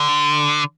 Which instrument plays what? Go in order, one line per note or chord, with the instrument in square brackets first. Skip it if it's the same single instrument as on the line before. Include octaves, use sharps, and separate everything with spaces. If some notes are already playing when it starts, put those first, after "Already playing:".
Already playing: [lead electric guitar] D3